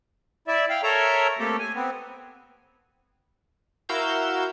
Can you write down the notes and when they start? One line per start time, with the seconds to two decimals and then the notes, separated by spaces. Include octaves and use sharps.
0.48 E4 D5 E5
0.70 F5 G5
0.83 A4 A#4 C#5 E5 A#5
1.39 A3 A#3 C4 G4 A4
1.59 G#5
1.75 B3 C4
3.89 E4 F#4 A#4 F5 E6 G6